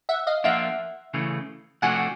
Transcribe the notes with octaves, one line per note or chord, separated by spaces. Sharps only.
E5 F#5
D#5 F5
F3 A#3 D4 F4 E5 F#5
C#3 E3 A3
C3 F3 A3 D4 F#4 F#5 G#5